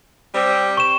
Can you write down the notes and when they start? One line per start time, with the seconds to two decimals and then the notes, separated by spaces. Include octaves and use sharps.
0.34 G3 C4
0.77 C#6 E7